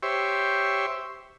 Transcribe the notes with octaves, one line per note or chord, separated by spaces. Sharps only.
G4 C5 C#5 E5